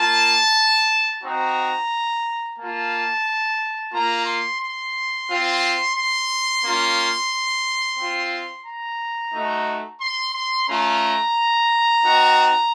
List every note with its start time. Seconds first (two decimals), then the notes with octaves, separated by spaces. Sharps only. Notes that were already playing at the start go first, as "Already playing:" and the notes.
Already playing: A#3 F4 A5
1.22 C4 D#4 F#4 A#5
2.57 A#3 F4 A5
3.92 A#3 F4 A#5
4.26 C6
4.60 C6
5.28 C4 F4
5.95 C6
6.63 A#3 C#4 F4
7.97 C4 F4
8.65 A#5
9.33 A3 D#4 F#4
10.00 C6
10.34 C6
10.67 A3 C#4 F4 A#5
12.03 C4 D#4 F#4